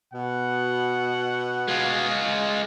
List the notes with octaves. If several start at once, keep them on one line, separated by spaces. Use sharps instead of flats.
B2 F#5
G#3 F4